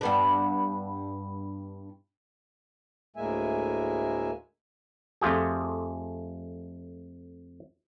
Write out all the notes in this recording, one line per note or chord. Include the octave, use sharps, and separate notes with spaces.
G2 B3 D4
D2 A2 G#3 A#3 E5 G#5
F2 A3 F4 G4 G#4